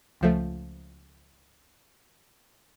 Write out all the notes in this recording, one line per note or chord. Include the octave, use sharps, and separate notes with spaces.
C#2 F3 A3